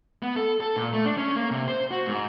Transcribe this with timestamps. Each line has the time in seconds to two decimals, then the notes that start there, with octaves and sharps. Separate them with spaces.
0.23 B3
0.36 A4
0.60 A4
0.77 A#2
0.93 A3
1.05 D4
1.17 C#4
1.36 A#3
1.51 C3
1.68 C5
1.91 F#4
2.06 G#2